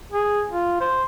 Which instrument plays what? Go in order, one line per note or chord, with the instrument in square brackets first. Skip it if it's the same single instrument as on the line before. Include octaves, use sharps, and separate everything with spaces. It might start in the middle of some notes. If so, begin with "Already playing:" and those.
[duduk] G#4
F4
C5